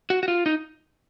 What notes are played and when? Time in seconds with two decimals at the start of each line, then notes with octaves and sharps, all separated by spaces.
0.10 F#4
0.23 F#4
0.28 F4
0.46 D#4